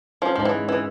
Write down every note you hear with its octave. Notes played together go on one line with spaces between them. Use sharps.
F3 C#4
G#2 F3
E3
G#3
E3 C#4